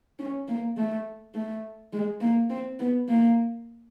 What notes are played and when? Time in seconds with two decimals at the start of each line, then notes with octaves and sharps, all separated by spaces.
0.19 C#4
0.48 A#3
0.77 A3
1.34 A3
1.93 G#3
2.21 A#3
2.50 C4
2.79 B3
3.08 A#3